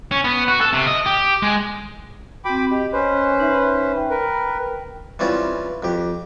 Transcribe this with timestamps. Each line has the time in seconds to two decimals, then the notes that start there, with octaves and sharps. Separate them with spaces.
0.11 C#4
0.24 B3
0.48 F#4
0.61 A4
0.73 C3
0.87 D#5
1.06 G4
1.42 G#3
2.45 C4 F#4 G5 B5 D6
2.71 G4 D#5
2.93 C#4 B4 C5
3.40 D#4 E5
3.96 G5
4.10 A#4 B4
5.19 E3 G3 C4 C#4 E4 F4
5.83 F2 G4